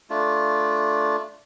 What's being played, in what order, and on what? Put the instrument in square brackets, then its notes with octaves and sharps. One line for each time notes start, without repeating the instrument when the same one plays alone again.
[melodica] A3 D4 F4